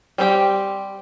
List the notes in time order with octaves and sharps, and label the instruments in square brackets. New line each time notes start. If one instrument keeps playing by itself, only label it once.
[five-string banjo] G3 C4 G4